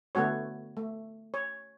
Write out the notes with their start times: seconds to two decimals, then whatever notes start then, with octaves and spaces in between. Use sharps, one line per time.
0.15 D3 A3 B3 F#4 C#5
0.77 A3
1.34 C#5